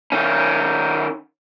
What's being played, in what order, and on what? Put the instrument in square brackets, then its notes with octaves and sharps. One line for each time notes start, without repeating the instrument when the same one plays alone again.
[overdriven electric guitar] D#3 C#4